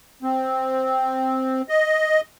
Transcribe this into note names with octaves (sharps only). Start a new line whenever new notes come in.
C4
D#5